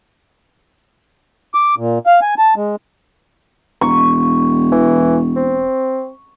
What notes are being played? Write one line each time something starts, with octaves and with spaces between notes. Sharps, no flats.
D6
A#2
F5
G#5
A5
G#3
E1 C#6
E3
C4